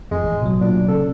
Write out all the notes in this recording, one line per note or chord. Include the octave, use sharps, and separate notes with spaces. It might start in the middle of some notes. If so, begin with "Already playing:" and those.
F2 G#3
A1
B2 F#3
A#2 D4
C#3 A4